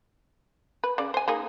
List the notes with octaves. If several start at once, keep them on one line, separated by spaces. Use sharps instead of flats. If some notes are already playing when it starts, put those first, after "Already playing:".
B4
C#3 D5
C5 G#5
A#3 D#4 G#4